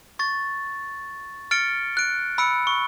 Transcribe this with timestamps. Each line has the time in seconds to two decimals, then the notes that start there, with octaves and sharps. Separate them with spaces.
0.19 C#6 A6
1.51 F6 A6 C#7 D7 G7
1.97 F#6 D7
2.38 B5 E6 F#6 C#7 D7
2.67 C#6